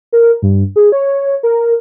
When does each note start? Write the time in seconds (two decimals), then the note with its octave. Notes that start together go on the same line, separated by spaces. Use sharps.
0.13 A#4
0.42 G2
0.76 G#4
0.92 C#5
1.43 A#4